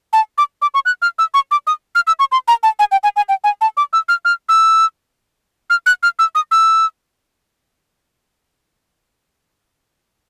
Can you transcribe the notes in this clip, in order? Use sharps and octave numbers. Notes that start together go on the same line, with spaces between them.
A5
D6
D6
C#6
F#6
F6
E6
C#6
D6
D#6
F6
E6
C#6
C6
A#5
A5
G#5
G5
G#5
G#5
G5
G#5
A5
D6
E6
F6
F6
E6
F6
F#6
F6
E6
D#6
E6